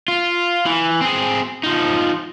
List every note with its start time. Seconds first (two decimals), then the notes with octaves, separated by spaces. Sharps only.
0.08 F4
0.66 E3
1.01 C4 G#4
1.63 F3 D#4